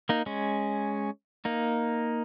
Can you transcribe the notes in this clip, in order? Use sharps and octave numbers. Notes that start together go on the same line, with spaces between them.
A#3 D#4
G#3 C#4
A#3 D#4